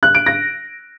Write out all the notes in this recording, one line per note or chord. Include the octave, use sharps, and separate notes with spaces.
F#6
D7
A#6